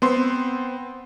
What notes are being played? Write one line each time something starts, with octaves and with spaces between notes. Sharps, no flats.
B3 C4 C6